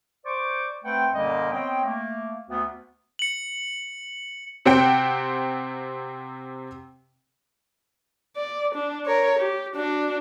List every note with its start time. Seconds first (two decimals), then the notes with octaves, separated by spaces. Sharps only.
0.25 C5 D5 C#6 D6
0.84 A3 C4 B4 C5 F#5 G5
1.14 F#2 A#2 D3 G3 A#3 D#5
1.51 B3 C4 C#5 D#5 G5
1.84 A3 A#3
2.48 D2 B3
3.19 C#7 F#7
4.65 C3 C4 F#5 G5
8.36 D5
8.75 D4
9.06 A#4 C#5
9.39 G4
9.76 D4 F#4